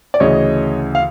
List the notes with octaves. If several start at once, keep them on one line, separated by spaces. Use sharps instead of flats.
D5
D2 C#3 E3 C#5 D#5
F5